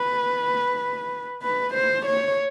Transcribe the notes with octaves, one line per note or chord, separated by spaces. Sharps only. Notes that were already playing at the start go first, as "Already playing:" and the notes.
Already playing: B4
B4
C5
C#5